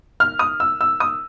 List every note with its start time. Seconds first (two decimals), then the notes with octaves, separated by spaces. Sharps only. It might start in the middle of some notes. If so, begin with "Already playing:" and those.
0.20 F6
0.39 D#6
0.60 E6
0.81 E6
1.00 D#6